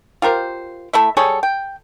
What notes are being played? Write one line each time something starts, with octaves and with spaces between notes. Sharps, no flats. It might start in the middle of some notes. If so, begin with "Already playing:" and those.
F4 G4 A#4 C5
A3 E4 E5
G3 G#4 A4 C#5
G5